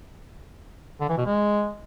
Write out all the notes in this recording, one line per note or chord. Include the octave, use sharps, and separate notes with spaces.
D3
E3
B2
G#3